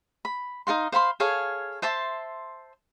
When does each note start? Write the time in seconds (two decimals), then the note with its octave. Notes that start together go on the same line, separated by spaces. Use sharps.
0.25 B5
0.67 D#4 A#4 F5 C6
0.92 C5 F5 B5 C6
1.20 G#4 A4 C#5 F5
1.82 C5 E5 A5 C6